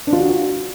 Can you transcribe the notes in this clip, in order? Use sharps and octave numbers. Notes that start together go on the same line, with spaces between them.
D4
F4
F#4